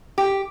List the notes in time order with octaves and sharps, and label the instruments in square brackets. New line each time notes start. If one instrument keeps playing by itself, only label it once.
[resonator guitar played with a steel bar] G4